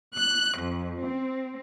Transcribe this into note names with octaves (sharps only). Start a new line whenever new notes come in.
F#6
F2
C4